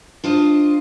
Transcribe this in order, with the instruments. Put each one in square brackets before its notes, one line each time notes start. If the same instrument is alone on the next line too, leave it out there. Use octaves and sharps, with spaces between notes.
[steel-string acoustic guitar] D4 F4 C5 D#5